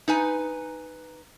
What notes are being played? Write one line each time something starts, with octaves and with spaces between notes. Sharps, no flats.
D#4 B4 G#5